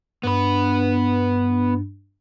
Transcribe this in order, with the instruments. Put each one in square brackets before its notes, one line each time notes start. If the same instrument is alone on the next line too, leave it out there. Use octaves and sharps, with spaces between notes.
[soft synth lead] G2 [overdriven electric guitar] B3 B4